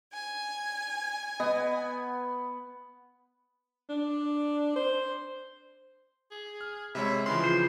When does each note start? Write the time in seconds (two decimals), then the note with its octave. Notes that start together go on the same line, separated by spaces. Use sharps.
0.14 G#5
1.40 B3 D#5
3.89 D4
4.76 C5
6.31 G#4
6.61 F6
6.95 C3 G#3 C#5 E5 B5
7.26 C#3 E3 F3 C6
7.44 F4 C5